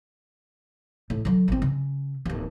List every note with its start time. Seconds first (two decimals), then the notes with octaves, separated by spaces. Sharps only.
1.10 A2
1.25 D3 F#3
1.48 A1 C4
1.62 C#3
2.25 D1 D#2